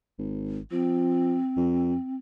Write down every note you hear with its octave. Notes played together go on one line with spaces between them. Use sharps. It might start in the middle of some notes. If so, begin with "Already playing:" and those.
G#1
F3 C4
F2